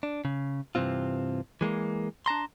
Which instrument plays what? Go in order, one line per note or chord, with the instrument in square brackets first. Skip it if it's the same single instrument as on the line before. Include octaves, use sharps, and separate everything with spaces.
[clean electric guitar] D4
C#3
G2 C3 E3 C4 F4
E3 G#3 A#3
D4 A5 A#5 C6